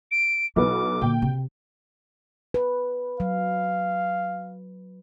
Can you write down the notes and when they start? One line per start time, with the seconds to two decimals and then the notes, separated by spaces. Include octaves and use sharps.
0.11 D7
0.56 B1 B3 E4 D6
1.01 A#2 D3 G5
1.22 C3
2.54 B4
3.20 F#3 F5